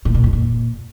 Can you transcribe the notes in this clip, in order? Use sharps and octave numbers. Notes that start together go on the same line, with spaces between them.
A2
A#2
F2
A#2